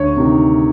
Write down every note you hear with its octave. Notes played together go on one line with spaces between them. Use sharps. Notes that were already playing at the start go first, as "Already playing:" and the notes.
Already playing: D2 C#5
C3 D#3